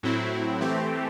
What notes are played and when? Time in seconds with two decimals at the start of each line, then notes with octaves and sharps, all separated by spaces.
0.03 A2 F#3 C4 E4
0.61 E3 A3 C4 G4